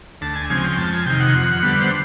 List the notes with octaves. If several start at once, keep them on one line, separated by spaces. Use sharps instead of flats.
D2 A5
G#5
C#3 F3 G#3 C4 G#5
G5
F2 A5
G#5
C3 D#3 G5
F#5
F2
D3 G3 B3
C5